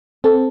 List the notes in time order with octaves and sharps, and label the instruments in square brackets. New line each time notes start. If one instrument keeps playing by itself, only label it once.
[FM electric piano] C4 [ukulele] A4